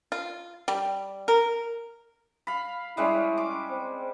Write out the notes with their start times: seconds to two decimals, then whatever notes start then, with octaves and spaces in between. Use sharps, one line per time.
0.12 F4
0.68 G3
1.28 A#4
2.47 F5 B5
2.97 G3 G#3 C#4 E4
3.38 D6
3.70 C4